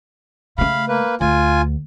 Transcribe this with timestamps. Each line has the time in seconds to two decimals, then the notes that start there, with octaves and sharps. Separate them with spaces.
0.58 C#3 A3 F5 B5
0.88 A#3 B4
1.21 D2 F4 G#5